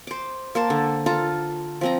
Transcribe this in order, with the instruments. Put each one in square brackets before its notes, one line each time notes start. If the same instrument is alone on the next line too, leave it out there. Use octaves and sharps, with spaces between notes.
[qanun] C5 D6
A#3 C5 A5
D3
F4 A4 A5 A#5
F3 C4 A#5